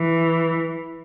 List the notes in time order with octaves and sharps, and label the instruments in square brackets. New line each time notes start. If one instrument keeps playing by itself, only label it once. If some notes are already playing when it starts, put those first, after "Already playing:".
Already playing: [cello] E3